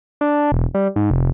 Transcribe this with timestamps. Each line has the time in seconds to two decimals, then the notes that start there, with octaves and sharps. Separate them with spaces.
0.21 D4
0.52 E1
0.74 G3
0.96 G#2
1.11 F1